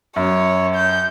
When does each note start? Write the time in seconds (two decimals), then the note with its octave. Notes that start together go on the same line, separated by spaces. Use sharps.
0.16 F#2 C#5
0.75 G6